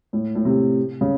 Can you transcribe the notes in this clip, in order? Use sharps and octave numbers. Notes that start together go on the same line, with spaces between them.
A2
A2
C3
C#3